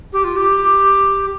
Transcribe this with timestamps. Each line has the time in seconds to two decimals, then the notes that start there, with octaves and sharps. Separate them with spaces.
0.12 G4
0.23 F4
0.36 G4